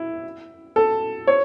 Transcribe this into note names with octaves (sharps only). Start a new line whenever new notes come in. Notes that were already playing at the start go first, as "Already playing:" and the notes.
Already playing: E4
A4
C#5